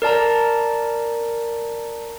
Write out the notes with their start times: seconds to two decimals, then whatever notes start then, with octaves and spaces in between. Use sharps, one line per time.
0.02 A#4 D5 A5 A#5